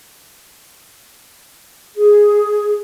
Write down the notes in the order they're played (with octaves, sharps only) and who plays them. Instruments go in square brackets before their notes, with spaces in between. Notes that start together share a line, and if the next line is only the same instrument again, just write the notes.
[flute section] G#4